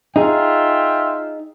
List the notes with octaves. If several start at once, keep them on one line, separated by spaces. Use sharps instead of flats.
D#4 F4 G#4 E5 G5